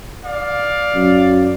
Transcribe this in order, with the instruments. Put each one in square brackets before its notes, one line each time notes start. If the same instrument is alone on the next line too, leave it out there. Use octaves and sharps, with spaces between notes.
[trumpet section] D5 F5
[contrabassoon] F#2